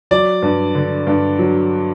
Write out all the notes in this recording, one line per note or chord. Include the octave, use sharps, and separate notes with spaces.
F#3 D5
G2
D3
G2
F#3